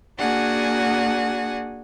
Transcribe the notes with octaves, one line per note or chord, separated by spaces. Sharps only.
A#3 D4 F#4 G#4 F#5 G#5